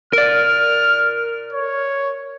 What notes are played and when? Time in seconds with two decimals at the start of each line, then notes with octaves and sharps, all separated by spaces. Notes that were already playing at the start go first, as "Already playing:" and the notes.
0.13 A#4 D5 F6
1.53 C#5